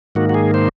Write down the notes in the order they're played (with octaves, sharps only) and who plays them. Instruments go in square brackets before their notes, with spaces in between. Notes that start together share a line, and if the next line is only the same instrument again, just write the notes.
[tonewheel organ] G#2 D#3 A#3 F#4
F#4
G#4
C5